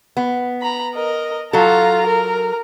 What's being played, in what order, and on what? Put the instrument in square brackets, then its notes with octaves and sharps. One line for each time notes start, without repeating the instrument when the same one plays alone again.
[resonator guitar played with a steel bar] B3
[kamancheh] A#5 B5
A#4 D#5
[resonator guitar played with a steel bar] F#3 A4 [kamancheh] F4 A#5
[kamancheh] A#4